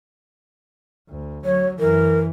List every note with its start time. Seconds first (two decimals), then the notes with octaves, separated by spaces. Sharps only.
1.09 D2
1.45 F#3 C#5
1.80 F#2 E3 A#4